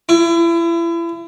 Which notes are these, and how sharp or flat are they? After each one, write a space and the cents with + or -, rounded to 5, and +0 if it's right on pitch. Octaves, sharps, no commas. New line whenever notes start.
E4 +35